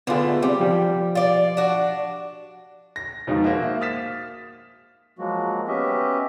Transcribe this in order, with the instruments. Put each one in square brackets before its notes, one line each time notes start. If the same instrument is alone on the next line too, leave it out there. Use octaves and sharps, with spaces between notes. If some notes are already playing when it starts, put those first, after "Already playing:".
[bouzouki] D3 A3 [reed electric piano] B3 F4 G#4
[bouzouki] G3 [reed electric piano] C4
[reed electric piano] F3 G4
[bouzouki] F4 D5
D4 F#4
[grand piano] A#6
F2 B2 D#3 F3 G#3 D#4
A#3 F#4 C5 E5
D#6 F6 A6 B6 E7
[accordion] F3 F#3 G#3 A#3 F#4
B3 C#4 G4 D#5 E5